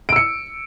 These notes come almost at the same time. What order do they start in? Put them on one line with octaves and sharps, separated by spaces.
D7 E6 C#7